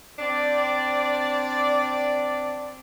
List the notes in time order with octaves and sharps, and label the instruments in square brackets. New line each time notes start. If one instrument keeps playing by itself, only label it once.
[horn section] C4 D4 D5